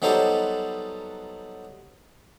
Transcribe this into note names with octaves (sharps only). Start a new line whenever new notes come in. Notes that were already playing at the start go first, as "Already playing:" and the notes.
F#3 G3 B3 D#4 A4 C5